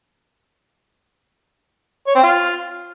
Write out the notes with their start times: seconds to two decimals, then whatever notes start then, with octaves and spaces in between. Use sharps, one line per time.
2.07 C#5
2.15 C4
2.23 F4